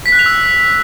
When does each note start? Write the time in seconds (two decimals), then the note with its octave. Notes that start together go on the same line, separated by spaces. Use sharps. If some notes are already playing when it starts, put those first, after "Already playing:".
0.06 B6
0.12 F#6
0.19 F7
0.26 E6